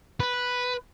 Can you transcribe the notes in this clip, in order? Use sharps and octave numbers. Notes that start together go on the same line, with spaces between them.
B4